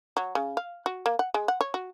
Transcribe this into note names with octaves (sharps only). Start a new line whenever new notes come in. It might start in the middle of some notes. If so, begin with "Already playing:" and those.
F#3
C#3
F5
F#4
A#3
F#5
G#3
F#5
C#5
F#4